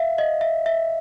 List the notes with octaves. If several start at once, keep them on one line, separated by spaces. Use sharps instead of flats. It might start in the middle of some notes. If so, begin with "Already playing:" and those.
Already playing: E5 F5
D#5
E5
E5